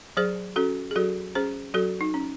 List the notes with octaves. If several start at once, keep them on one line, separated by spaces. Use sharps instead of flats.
F#3 G#4 C5
C#4 F#4 A4
G#4
F#3 F#4 A4
C#4 G#4 C5
F#3 F#4 A4
D#4
C#4